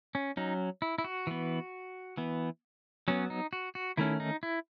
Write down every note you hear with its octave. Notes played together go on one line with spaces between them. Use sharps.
C#4
F#3 C#4 D#4
E4
E4
F#4
E3 B3
E3 B3
F#3 B3 C#4
D#4
F#4
F#4
D#3 A3 C#4 E4
D#4
E4